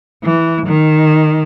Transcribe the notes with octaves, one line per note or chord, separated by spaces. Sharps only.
E3
D#3